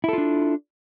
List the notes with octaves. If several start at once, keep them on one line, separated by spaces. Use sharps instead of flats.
D4 E4 F4 A4